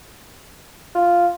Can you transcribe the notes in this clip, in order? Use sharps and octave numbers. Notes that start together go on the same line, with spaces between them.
F4